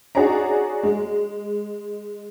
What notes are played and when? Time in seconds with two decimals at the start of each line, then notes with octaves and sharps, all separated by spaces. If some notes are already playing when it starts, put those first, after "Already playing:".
0.15 D#4 F#4 G#4 C#5 D5 A#5
0.83 G#3